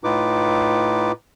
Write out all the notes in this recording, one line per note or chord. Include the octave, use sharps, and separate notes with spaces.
A2 D#4 F4 B4 D6